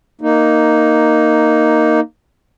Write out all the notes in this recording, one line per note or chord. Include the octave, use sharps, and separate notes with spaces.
A#3 D#4